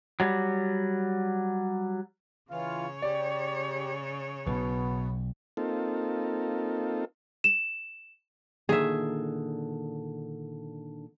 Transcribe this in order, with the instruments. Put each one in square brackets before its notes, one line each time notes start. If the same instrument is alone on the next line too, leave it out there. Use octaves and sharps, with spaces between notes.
[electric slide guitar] F#3 G3
[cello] C#3 C#5 [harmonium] E3 F4 F5
[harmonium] G4 [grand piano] D5
[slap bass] B1 [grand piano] B2 [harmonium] B3
[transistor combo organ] A#3 C4 D#4 F4 A4
[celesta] E7
[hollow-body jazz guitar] A#2 D3 D#3 [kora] G#4 E5